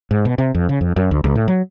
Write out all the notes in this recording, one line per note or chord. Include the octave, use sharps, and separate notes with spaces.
G#2
B2
C3
F2
C#3
F2
F#2
D2
C#2
A2
F#3